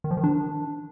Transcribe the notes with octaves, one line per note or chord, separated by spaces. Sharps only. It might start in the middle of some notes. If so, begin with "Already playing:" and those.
D#3
F3
D#3
D4